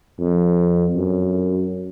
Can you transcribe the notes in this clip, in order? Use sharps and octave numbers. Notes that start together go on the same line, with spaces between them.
F2
F#2